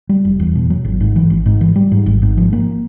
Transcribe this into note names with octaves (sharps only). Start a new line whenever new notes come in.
G3
F1
E2
B2
F#3
G#1
G#2
E3
G#1
G#2
E3
G3
G#2
G#1
G#2
F3
A#3